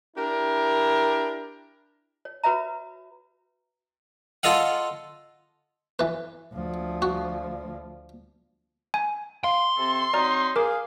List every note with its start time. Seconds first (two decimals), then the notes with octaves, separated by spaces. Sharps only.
0.17 D4 E4 G4 A#4
2.25 C#5
2.44 F#4 B4 C#5 E5 A#5
4.43 F4 A4 D#5 F5 F#5
5.99 E3 B4
6.53 D2 F3
7.02 F#4
8.94 G#5
9.44 F5 C6
9.77 C3 C4 A4
10.14 F#3 C4 D#4 D5 A#5 F6
10.56 G#4 A#4 F5 D6